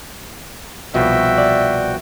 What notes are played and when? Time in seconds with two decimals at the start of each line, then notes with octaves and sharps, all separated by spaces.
0.94 C2 B2 F3 F#4 E5 G5
1.38 D5